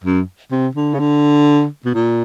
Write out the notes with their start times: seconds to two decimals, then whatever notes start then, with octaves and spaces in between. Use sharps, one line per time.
0.04 F#2
0.51 C3
0.75 D3
0.94 C#3
0.99 D3
1.85 B2
1.94 A#2